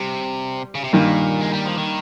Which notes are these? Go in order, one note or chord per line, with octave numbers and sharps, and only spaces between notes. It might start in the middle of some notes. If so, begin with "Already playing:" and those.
Already playing: C3 G3
C#3
C3
G2 A#2 D#3 A#3
G#3
G3
F3
D#3